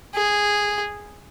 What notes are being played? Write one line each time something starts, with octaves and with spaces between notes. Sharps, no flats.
G#4